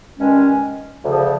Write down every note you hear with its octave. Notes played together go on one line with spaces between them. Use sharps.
G2 D#3 G#3 C#4
D2 C#3 F3